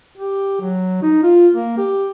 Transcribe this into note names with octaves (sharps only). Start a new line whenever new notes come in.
G4
F#3
D#4
F4
A#3
G4